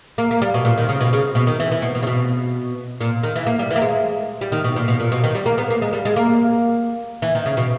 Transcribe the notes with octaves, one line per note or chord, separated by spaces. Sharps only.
A#3
A#3
G3
B2
A#2
D#3
C#3
B2
C#3
B2
D#3
E3
E3
B2
B2
C#3
B2
A#2
D#3
E3
A#3
G3
E3
A#3
G#3
G3
D#3
B2
A#2
B2
A#2
B2
D#3
G3
A#3
B3
A#3
G#3
G3
G#3
A#3
E3
D#3
C#3
B2